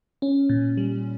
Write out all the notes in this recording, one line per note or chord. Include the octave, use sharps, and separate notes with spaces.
C#4
A#2
G3